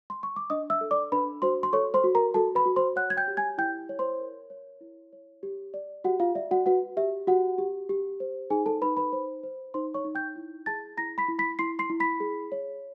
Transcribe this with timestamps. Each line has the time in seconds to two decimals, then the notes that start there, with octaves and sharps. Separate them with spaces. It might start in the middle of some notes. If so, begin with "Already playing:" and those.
0.10 C6
0.23 C#6
0.36 D6
0.50 D4 D#5 D#6
0.70 E5 E6
0.81 A4
0.91 D5 D6
1.12 D4 B4 B5
1.42 F#4 C5 C6
1.63 C6
1.73 A4 C#5 C#6
1.94 C5 C6
2.04 F#4
2.15 A#4 A#5
2.34 F#4 A4 A5
2.55 B4 B5
2.66 F#4
2.76 C5 C6
2.96 C#5 F#5 F#6
3.10 G#6
3.17 G5 G6
3.28 G4
3.37 G#5 G#6
3.58 E4 G5 G6
3.89 C#5
3.99 C5 C6
4.20 A#4
4.50 C#5
4.81 E4
5.13 C#5
5.43 G4
5.74 D5
6.04 F#4 G4 F#5
6.20 F4 F5
6.35 D5 E5
6.51 F#4 F#5
6.66 F#4 B4 F#5
6.97 G4 E5
7.27 F#4 G4 F#5
7.58 G4
7.89 G4
8.20 C5
8.50 D#4 G#4 G#5
8.66 A4 A5
8.82 D#4 B4 B5
8.97 B4 B5
9.13 C5
9.43 C5
9.74 D#4 C5 C6
9.94 C#5 C#6
10.05 D#4
10.15 G5 G6
10.36 E4
10.66 G#4 A5 A6
10.97 E4 A#5 A#6
11.18 B5 B6
11.28 E4
11.39 B5 B6
11.59 E4 C6 C7
11.79 C6 C7
11.90 E4
12.00 B5 B6
12.20 G#4
12.52 C#5